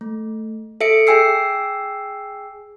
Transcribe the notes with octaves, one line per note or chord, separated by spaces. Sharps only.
A3
A4 E5 C#7 D7
G#4 G5 G#5 E6 C7